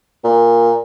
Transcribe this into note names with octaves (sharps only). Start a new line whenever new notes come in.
A#2